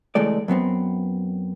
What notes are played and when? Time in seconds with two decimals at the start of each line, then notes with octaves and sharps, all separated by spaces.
0.15 C#2 E3 G#3 A3 D5
0.48 F#2 F#3 B3 C4